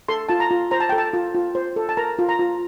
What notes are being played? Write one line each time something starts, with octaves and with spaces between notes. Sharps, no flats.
A4 C6
F4 A5
A#5
F4
C5 A#5
A5
A4 G5
A5
F4
F4
C5
A4
A5
A#4 A#5
F4
A#5
F4